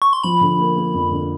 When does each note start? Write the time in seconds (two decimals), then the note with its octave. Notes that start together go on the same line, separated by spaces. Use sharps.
0.02 C#6
0.13 C6
0.23 F3 B5
0.41 D3
0.59 A#3
0.76 A#3
0.94 F2
1.11 D3